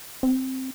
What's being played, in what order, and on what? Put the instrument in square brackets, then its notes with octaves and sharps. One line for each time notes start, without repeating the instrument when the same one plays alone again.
[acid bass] C4